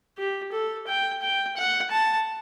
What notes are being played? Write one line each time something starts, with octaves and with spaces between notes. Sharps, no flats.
G4
A4
G5
G5
F#5
A5